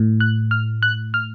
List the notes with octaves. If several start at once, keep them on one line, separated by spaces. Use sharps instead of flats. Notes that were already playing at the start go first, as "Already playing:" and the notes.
Already playing: A2
F#6
F6
F#6
F6